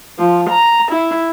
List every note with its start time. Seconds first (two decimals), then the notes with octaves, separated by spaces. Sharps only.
0.19 F3
0.50 A#5
0.93 E4